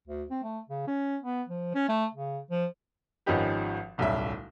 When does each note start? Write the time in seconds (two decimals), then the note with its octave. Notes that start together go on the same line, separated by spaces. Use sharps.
0.08 D2
0.30 C4
0.43 A3
0.69 C#3
0.87 C#4
1.22 B3
1.49 F3
1.74 C#4
1.89 A3
2.14 C#3
2.51 F3
3.26 G#1 F3 C#4 D#4 G4 B4
3.98 D1 B1 G3 C#4 E5